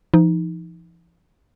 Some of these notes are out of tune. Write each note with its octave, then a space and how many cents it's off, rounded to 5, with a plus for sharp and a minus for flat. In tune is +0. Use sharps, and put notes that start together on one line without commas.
F3 -45 D#4 +10